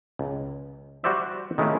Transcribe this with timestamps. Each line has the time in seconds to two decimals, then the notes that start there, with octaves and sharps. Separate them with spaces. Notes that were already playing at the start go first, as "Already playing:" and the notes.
0.19 C#2
1.04 G3 F#4 G4 C5 D5 E5
1.58 D#3 G#3 A3 C#4 E4 F4